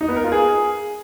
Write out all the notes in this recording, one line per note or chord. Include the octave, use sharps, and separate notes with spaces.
D#4
B3
A#4
F4
G#4